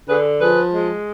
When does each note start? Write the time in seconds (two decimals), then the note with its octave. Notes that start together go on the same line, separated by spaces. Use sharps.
0.08 D3 G#4 B4
0.41 F3 G#4 B4
0.74 G#3